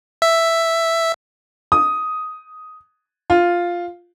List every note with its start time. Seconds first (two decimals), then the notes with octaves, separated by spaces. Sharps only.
0.22 E5
1.72 D#6
3.30 F4